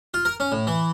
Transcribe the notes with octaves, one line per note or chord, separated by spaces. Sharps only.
F4
A#4
C#4
A2
E3